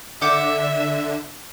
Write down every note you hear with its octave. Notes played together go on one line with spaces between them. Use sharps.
D3 E5 F#5 D6 G6